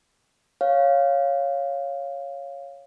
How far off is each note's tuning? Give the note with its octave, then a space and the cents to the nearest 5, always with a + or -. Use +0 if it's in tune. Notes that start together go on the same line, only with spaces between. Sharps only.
C#5 +0 F5 +0